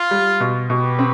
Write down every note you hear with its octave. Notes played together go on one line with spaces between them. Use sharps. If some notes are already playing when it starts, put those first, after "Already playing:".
Already playing: F4
G3
B2
B2 G4 B4
C4